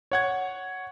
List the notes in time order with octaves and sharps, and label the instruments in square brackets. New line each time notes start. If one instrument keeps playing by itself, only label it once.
[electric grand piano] C#5 F#5 G#6